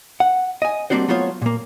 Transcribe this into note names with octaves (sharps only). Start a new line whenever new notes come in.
F#5
D#5 G#5
G3 A#3 C4 D4 F#4 C5
F#3 A3 B3 F4 C5 C#5
A#2 A#3